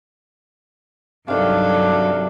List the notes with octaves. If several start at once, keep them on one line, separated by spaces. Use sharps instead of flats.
G2 C3 D#3 F#3 D4 A4 D5 F5